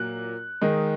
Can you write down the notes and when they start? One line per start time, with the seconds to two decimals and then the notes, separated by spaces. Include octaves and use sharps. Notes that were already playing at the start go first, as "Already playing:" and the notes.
Already playing: A#2 F#3 A#3 F#6
0.61 D#3 G#3 D#4